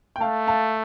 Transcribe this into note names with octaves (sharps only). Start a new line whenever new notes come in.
G5
A3 F5 A5
F5 A5